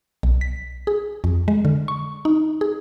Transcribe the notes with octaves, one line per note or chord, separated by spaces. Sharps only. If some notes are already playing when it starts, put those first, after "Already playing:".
B1
B6
G#4
F2
G#3
D3
C#6
D#4
G#4